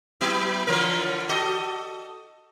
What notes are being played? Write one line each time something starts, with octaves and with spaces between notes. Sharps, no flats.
F#3 B3 E4
D3 E3 A#4
F#4 A4 D#5